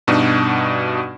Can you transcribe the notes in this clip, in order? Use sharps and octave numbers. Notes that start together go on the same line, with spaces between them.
G2 B2 D4 D#4 F#4